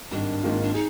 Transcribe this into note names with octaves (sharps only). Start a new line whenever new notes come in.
G#1 G2 D#3 D4
G#1 G#2 D#3 A#3 F4
D4
D#4 G#4